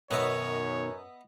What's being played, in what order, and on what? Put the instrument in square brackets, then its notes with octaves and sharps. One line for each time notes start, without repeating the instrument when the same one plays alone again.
[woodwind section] F#2 [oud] B2 D#3 [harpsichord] B3 D#5 E5 [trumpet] C#5